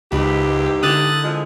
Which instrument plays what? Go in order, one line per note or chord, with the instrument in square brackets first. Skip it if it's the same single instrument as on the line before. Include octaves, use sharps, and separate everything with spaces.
[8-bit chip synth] C#2 [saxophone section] G#2 E3 G4 [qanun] B4
[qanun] D3 E4 A#4 [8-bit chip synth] D#6 F#6 A6
[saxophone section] F3 G#3